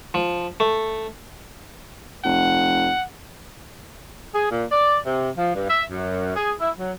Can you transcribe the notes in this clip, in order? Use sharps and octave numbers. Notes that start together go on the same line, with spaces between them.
F3
A3
F1 F#5
G#4
A#2
D5
C3
F3
G2
E5
F#2
G#4
E4
F#3